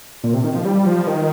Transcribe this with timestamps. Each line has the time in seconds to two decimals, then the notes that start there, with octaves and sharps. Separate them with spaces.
0.24 A#2
0.34 C3
0.44 D#3
0.55 F3
0.65 G3
0.87 F3
1.07 D#3